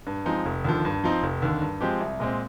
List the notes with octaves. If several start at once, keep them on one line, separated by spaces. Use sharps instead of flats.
G2
F3 G#3 C4 D#4
F1
D#2 D3 F3
G2
F3 C4 D#4
F1
D#2 D3
G2
F3 G#3 C4 G4
C2
A#2 G#3 C4